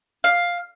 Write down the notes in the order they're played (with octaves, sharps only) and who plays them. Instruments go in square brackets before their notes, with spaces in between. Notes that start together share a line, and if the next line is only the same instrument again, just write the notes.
[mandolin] F5